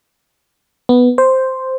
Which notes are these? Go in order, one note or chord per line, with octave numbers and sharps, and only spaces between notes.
B3
C5